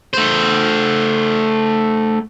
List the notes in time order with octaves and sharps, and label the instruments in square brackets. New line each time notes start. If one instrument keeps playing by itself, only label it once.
[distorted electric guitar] A3 C5